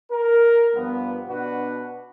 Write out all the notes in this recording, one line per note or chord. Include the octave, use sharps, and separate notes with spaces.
A#4
G2 F3 B3
B2 D4 F#4 B4